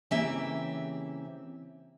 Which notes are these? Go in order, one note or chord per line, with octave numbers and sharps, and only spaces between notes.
C#3 E3 A#3 C4 G4 E5